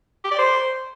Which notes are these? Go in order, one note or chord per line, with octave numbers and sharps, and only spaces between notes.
G4
D5
C5